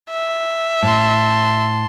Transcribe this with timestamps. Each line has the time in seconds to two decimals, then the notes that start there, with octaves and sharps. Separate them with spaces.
0.10 E5
0.83 A2 A5 C6